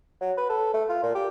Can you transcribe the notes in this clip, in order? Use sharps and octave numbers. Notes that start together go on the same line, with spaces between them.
F#3
B4
A4
A3
F4
A#2
G4